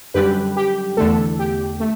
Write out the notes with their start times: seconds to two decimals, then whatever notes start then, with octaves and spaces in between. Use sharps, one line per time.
0.14 F#2 D3 G3 G4 B4
0.57 G4
0.97 E2 D3 A3 A4
1.39 G4
1.80 A3